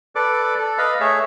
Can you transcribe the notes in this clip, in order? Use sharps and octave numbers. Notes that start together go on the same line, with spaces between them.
A4 B4 D5 D6
A4
B4 D#5 F5 B5
A3 G#4 C#5 E5